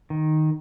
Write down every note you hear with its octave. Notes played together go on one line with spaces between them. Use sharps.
D#3